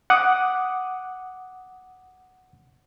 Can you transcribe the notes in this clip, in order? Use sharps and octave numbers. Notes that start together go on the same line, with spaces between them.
F#5 D6 D#6